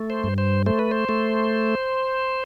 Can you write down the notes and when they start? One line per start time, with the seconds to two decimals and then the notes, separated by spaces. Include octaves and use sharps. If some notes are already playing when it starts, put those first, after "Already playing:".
Already playing: A3
0.10 C5
0.24 G2
0.38 C5
0.66 A3 C5
0.79 B4
0.91 C5
1.09 A3